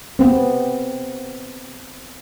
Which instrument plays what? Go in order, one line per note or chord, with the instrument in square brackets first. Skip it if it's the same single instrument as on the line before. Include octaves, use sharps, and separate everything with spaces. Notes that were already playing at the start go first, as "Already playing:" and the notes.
[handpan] B3 C4